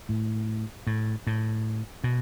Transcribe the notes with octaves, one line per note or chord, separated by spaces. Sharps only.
A2
A2
A2
B2